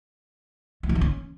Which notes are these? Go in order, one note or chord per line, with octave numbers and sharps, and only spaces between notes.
A3
D#3
E3
C#4